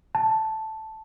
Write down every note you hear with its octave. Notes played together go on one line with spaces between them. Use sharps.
A5